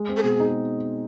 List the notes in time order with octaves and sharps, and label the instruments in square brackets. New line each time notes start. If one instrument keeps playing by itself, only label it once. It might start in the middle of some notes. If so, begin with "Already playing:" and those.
Already playing: [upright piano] G#3
C4
[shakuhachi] A4
[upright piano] B2 [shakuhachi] G#4
[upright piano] D#4